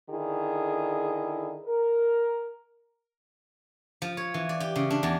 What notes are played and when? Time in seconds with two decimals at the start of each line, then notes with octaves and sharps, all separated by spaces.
0.10 D3 D#3 E4 G#4
1.66 A#4
4.02 F3
4.17 C#5
4.34 E3
4.49 D5
4.60 G4
4.76 C#3
4.90 D4
5.03 E2